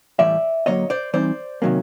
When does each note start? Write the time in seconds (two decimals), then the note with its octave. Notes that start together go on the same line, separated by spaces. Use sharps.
0.19 A2 E3 G3 D5 E5
0.66 D3 F#3 A#3 C#5 D#5
0.90 C5 D5
1.13 E3 G3 C4 D#4 C5 D5
1.62 C3 D#3 F#3 A#3 C#4